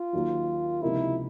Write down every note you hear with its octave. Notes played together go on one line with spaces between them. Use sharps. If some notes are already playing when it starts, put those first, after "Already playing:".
Already playing: F4
D#2 D#3 F#3
C#2 C3 F3 A#3 D#4 E4